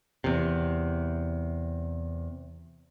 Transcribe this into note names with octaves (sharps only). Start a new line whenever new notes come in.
E2 C3